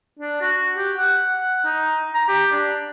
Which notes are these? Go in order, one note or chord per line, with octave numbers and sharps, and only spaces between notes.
D4
F#4
G4
F#5
D#4
A#5
G4
D4